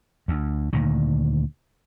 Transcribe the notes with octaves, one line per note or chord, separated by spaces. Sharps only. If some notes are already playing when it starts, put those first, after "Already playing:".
D2
D2 A#2 D#3